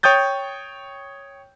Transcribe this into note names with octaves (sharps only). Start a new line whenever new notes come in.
C#5 G5 D#6 G6 A6